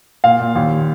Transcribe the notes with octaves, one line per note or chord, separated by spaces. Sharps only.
A#2 F5
A#2
D#2